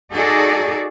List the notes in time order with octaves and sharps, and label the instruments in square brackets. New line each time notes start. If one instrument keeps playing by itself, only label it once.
[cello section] D#4 F#4 G#4 A4 D5